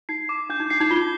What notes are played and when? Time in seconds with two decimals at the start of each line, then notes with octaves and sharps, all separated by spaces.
0.09 D#4 C7
0.29 D6
0.50 D4 G6
0.60 D#4
0.70 D4 C7
0.81 D#4
0.91 F4 G7